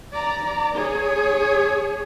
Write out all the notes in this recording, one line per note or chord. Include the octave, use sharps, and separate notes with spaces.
D5 A#5
G#4 C#5